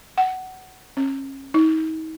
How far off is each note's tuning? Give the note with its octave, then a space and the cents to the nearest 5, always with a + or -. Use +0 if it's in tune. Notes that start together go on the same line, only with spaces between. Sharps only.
F#5 +15
C#4 -30
D#4 +40